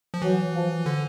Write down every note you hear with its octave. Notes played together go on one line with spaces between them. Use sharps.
F3
E3 F#3
F3
D3